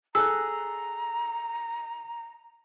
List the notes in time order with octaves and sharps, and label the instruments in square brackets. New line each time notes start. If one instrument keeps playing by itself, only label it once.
[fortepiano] G#4 A4 F#6 [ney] A#5 [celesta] E6